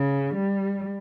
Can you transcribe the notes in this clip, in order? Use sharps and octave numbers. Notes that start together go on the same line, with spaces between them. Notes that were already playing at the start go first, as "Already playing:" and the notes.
Already playing: C#3
G3